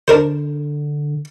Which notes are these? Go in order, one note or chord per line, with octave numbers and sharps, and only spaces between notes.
D3 D4 A#4 C5